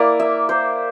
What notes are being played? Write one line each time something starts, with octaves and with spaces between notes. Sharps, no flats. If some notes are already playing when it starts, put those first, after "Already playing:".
Already playing: A#3 E4 D5
E5
C5